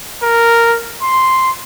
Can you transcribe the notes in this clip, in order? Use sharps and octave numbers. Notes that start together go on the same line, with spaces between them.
A#4
C6